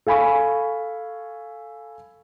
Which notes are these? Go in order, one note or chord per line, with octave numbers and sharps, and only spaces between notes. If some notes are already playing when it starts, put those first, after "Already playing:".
A4 F5 G#5 B5 C#6